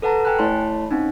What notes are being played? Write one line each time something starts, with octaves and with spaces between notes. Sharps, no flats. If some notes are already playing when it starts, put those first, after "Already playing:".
A4 B4 F#5 A5 A#5
G5 G#5 B5 F#6
A3 E4 C#5 A5 B5 C6
C4 C#4 D#4